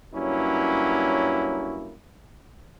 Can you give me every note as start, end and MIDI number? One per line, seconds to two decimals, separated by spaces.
0.13 1.95 43
0.13 1.95 54
0.13 1.95 58
0.13 1.95 61
0.13 1.95 64